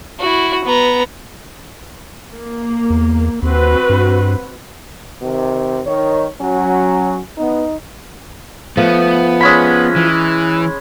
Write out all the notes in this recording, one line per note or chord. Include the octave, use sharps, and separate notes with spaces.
E4 F#4
B3 A#5
A#3
E2
D#2 C4 F#4 B4
G2
C3 D#3
D#3 C#5
F#3 C#4
B3 D#4
F3 A3 B3
G#3 C#4 B5
E3